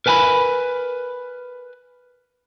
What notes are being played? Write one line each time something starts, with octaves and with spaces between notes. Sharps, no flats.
A#4 B4 G#5 A#5 B5